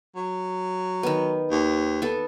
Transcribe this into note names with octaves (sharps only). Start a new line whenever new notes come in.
F#3
D#3 B3
D#2
B3 A4